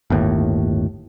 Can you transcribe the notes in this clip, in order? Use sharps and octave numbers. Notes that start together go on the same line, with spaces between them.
G1 D#2 A2